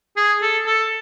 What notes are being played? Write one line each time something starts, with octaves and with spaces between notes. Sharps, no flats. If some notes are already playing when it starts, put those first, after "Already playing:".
G#4
A4
A4